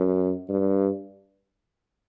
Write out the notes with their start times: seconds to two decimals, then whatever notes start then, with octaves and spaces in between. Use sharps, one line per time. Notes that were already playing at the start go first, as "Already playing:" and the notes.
Already playing: F#2
0.49 G2